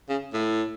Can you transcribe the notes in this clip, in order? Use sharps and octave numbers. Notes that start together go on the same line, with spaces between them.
C#3
A2